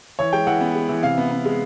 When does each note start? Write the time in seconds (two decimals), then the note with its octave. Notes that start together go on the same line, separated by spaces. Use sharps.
0.19 E3 C#5
0.33 G#3 G5
0.47 E3 F#5
0.61 B3
0.75 G#3
0.89 E3
1.03 C3 F5
1.18 B3
1.31 B3
1.45 G#3